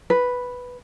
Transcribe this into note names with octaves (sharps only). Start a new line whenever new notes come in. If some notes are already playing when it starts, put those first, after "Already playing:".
B4